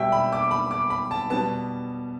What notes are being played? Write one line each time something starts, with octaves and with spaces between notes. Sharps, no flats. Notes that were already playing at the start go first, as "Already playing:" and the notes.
Already playing: B2 G3 B3 E5 G5
B5
D6
B5
D6
B5
A5
B2 G3 B3 A5